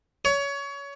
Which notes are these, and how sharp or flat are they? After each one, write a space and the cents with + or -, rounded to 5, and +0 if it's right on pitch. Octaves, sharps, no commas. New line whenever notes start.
C#5 +25